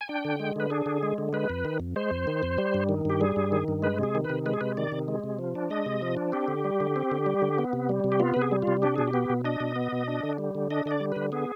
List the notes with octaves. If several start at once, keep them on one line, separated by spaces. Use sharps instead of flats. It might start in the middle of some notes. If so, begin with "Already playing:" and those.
G#5
D4 G5
D3
G#3
D3 B4
D4 G#4
D3
G#3
D3
G#3 B4
F2
D#3
F2
G#3 C5
F2
D#3
F2
G3
G2
D#3
G2 G4
G3 G#4
G2
D#3
G2
G#3 B4
C3 G#4
D#3
B4
C3
G#3 B4
G#4
C3 B4
D#3 D5
C3
G#3
C3
F3
D4
G#3 D#5
C3
F3
D4
C4 G4
D3
G3
D3
C4
D3
G3
D3
B3
C3
G3
C3
G4
B3 F4
C3 B4
G#4
G3
C3 F4
D4 G4
B2 G#4
G4
B3
B2
D4 D#5
B2
B3
B2
D4
D3
G3
D3
D4 D#5
D3 D#5
D5
G3
D3 B4
B3 G#4